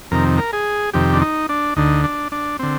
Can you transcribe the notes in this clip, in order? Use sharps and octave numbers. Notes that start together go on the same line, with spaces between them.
F2 C3 D#3 A#4
A#4
G#4
F2 C3 D#3 G4
D4
D#4
D4
D2 D3 D#4
D4
D4
D3 C4